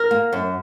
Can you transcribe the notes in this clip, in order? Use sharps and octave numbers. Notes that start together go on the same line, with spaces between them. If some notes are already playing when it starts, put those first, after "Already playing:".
Already playing: A#4
A#3
F#2